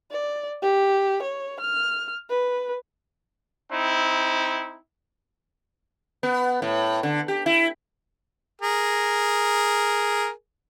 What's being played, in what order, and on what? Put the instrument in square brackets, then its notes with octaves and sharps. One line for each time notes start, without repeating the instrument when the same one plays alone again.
[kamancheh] D5
G4
C#5
F6
B4
[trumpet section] C4 D#4 E4
[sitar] B3
A2
D3
G4
E4
[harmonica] G#4 A#4